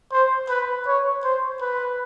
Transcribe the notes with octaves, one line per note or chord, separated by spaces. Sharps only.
C5
B4
C#5
C5
B4